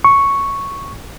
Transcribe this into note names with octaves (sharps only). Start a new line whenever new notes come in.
C#6